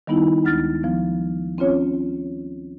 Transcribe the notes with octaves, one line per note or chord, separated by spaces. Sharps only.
D#3 G3 B3 D#4 E4
D2 G#3 D4 F6 A6
F3 B3
C4 C#4 F4 C#5